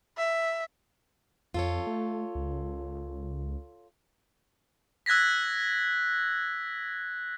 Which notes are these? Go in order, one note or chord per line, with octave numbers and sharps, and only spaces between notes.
E5
F2 F4 A4 C#5
A3
C#2
E6 F#6 G#6 A#6 B6